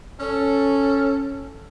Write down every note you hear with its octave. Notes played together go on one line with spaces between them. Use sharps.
C#4 A4